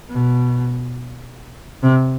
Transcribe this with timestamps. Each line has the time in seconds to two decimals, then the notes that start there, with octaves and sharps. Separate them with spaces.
0.10 B2
1.83 C3